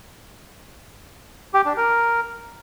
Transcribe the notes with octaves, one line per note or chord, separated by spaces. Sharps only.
G4
D4
A#4